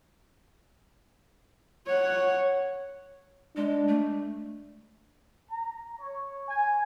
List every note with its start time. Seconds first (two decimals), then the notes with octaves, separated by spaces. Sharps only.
1.86 C#5 F#5
3.57 G#3 D4
3.88 A3
5.50 A#5
5.99 C#5
6.48 G#5